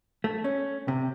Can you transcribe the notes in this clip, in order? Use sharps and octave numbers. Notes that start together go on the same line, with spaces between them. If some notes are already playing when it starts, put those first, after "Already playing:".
A3
C#4
C3